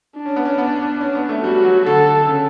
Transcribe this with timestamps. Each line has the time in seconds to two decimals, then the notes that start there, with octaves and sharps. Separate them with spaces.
0.17 D4
0.26 C#4
0.36 B3
0.45 C#4
0.58 B3
1.01 C#4
1.15 B3
1.29 A3
1.43 G3 F#4
1.65 F#3
1.85 D3 A4
2.28 C#3